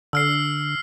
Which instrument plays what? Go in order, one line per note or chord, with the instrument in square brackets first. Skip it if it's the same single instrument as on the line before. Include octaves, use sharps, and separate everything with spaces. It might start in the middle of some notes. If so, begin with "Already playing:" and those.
[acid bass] D3 [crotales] E6 F6 C7